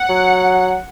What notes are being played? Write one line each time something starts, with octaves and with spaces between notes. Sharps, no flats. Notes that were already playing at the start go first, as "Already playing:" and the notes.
Already playing: F#5
F#3